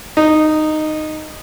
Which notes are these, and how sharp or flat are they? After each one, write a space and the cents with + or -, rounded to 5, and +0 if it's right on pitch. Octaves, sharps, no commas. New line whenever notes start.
D#4 -10